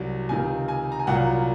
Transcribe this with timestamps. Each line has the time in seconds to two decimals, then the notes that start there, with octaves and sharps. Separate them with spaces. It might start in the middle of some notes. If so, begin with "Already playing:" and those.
Already playing: C2 C3 F#3
0.29 C#2 C3 D#3 G#5
0.68 G#5
0.92 A#5
0.99 G#5
1.07 C2 A#2 F#3 A#3 F#5